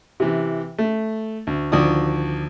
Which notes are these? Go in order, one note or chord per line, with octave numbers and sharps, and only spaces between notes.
C3 E3
A3
D2
D2 D#3 F3 D5 D#6